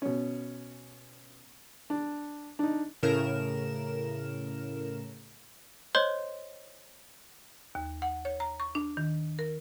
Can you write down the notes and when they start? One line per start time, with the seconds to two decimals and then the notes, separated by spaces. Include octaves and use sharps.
0.02 B2 C#4
1.90 D4
2.59 D4 D#4
3.03 A2 C#3 A#4 E7
5.95 C5 C#5 D#5 C6 G6
7.75 D#2
8.02 F#5
8.25 C#5
8.40 A#5
8.60 C#6
8.75 D4
8.97 D#3
9.39 A#4